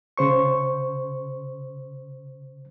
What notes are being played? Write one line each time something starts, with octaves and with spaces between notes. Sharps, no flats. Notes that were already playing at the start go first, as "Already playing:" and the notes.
C#3 C5 C#6